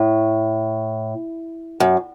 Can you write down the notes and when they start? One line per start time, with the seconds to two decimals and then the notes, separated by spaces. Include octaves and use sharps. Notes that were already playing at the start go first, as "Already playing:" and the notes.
Already playing: A2
1.80 F#2